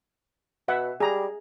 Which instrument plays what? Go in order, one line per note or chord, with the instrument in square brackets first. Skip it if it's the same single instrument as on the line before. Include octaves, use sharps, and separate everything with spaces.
[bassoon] B2 [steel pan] E5 F#5
[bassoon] G3 [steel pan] G#4 A#5